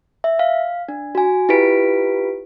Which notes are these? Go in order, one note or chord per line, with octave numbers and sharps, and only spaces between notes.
E5
F5
D4
F#4 G#5
E4 F4 G4 B4 B6 D7